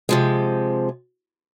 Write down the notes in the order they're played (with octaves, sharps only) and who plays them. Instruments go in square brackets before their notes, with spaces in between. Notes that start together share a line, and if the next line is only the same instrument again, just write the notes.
[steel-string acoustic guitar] C3 F3 G#3